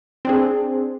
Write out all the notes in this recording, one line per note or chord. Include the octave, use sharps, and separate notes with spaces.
C4 D4 G#4